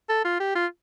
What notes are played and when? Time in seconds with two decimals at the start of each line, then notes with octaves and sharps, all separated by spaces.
0.09 A4
0.24 F4
0.40 G4
0.55 F4